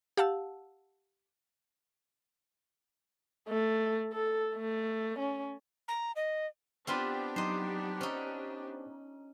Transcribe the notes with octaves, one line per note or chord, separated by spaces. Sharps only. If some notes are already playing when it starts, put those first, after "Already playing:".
G4 F5 F#5 A5 E6
A3
A4
A3
C#4
A#5
D#5
B3 C4 D4 F4 G4 B4
F#3 D#4 C5 D#5 A#5
C#4 D#4 C5